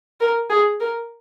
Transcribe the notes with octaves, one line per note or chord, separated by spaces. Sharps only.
A#4
G#4
A#4